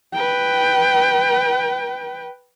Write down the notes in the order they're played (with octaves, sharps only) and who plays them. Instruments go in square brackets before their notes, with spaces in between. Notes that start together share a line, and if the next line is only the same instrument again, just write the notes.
[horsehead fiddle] B4 G5